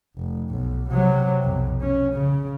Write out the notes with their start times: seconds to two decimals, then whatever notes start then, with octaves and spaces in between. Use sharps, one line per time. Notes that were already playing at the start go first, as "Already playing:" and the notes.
0.17 F1
0.50 B1
0.90 C3 F#3
1.43 B1 F2
1.81 C#4
2.12 C#3